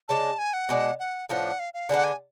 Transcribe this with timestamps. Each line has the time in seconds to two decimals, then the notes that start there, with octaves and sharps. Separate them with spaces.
0.09 C#3 G#3 D4 A5
0.39 G#5
0.53 F#5
0.69 B2 G#3 D4
0.99 F#5
1.29 A2 F3 B3 D4 F#5
1.59 F5
1.74 F5
1.89 D3 G#3 B3 D4 F#5
2.04 G#5